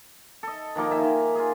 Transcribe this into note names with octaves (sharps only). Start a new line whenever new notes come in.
A4 D#5
D#3 F3 A#3 D#4
D#3 E5 G#5
D#3
F4 G#4